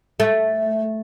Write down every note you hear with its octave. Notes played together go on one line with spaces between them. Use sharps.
A3